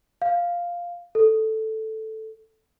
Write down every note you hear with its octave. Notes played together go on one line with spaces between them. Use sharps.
F5
A4